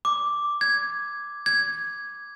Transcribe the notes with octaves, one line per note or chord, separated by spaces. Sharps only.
D6
G#6
G#6